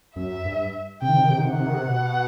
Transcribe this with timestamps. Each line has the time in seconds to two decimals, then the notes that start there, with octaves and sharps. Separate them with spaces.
0.16 F#2 E5
0.45 G2
1.02 C3 G5
1.09 D#3
1.16 C3
1.23 D#3
1.30 C3
1.38 D#3
1.45 C3 F#5
1.53 D#3
1.60 C3
1.67 D#3
1.74 C3
1.88 B2